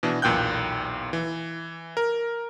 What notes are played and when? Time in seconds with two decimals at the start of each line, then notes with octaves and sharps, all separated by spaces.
0.03 B2 E3 D4
0.22 B1 E2 A#2 G5 F#6 G6
1.13 E3
1.97 A#4